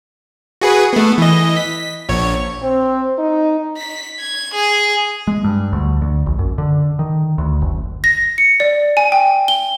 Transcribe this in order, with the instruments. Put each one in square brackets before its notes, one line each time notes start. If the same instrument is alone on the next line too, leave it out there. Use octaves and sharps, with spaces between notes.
[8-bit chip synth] F#4 G#4 B4
A3 B3
E3 D#5
B6
A#1 C#5
[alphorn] C4
D#4
[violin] B6
G#6
G#4
[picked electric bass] G#3
G2
D2
D2
A#1
F#2
D3
D#3
D2
F#1
[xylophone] A#6
C#7
D5
G#5
G5
G7